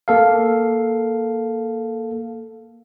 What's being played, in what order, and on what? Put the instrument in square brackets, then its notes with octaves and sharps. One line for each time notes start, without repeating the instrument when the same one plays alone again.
[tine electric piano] A#3 A4 F5